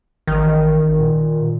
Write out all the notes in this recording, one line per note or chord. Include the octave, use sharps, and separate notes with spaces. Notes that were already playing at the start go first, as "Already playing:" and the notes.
A1 D#3
A#2